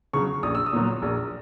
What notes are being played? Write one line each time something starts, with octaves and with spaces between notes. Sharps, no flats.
C#3 F#3 C#6
A#1 D#6
E6
D#6
A#2 F#3
A#1